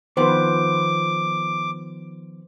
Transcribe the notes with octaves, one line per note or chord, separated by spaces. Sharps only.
D#3 F3 B3 B4 C5 D6